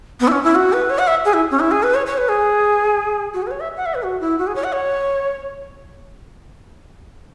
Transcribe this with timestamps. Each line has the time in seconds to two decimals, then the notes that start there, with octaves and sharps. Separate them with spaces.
0.20 B3
0.28 E4
0.32 C#4
0.44 E4
0.55 F#4
0.73 B4
0.90 C#5
0.98 F#5
1.07 E5
1.25 G#4
1.33 E4
1.51 C#4
1.60 E4
1.71 G#4
1.83 B4
1.94 C#5
2.06 C#5
2.18 B4
2.29 G#4
3.34 F#4
3.42 G#4
3.47 B4
3.51 C#5
3.60 E5
3.77 F#5
3.86 E5
3.94 B4
4.03 F#4
4.20 E4
4.38 F#4
4.47 G#4
4.55 C#5
4.64 F#5
4.73 C#5